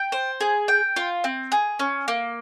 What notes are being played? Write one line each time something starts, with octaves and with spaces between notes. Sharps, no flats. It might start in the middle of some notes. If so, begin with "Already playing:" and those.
Already playing: G5
C5
G#4
G5
F4
C4
G#4
C#4
A#3